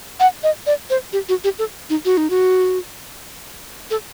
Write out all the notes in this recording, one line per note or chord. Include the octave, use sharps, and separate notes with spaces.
F#5
D#5
D5
C5
G4
F#4
G4
A4
D#4
F#4
D#4
F#4
A4